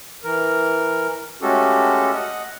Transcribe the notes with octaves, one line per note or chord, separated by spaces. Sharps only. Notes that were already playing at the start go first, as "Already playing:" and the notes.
E3 A#4
G#3 A3 C#4 F#4 G4 A4
D#5 F#5